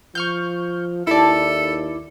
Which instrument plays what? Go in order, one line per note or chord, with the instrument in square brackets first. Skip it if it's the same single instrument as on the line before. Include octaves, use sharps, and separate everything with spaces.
[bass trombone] F3 [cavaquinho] F5 [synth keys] C#6 F6 G6
[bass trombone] D#2 [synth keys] E4 D5 [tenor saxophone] A4 [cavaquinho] E5 A5